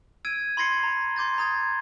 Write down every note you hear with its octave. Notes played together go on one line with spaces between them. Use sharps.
E6 G#6 D7 D#7
B5 C6 G#6 A#6 C7 C#7
A#5
C6 D6 G6 A6
A#5 D#6 G#6